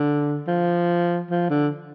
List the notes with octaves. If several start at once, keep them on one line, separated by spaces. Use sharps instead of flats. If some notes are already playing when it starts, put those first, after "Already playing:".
Already playing: D3
F3
F3
D3